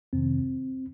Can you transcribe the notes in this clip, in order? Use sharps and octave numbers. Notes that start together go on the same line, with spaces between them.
F2 C3 D#3 C4